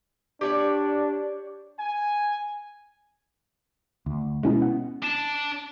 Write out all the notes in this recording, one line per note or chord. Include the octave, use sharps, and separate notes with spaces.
D4 G4 C#5 D5
G#5
D2
B2 G#3 C#4 E4
F#5
D4 A5